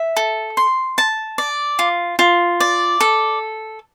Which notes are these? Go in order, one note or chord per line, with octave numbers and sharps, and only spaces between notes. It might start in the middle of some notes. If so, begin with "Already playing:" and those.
Already playing: E5
A4
C6
A5
D5
F4
F4
D5
A4